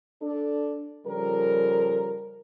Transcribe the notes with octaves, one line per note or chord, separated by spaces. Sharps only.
D4 A4
C#3 F3 G3 A4 A#4